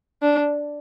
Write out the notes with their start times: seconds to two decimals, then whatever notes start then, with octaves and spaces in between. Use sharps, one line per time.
0.23 D4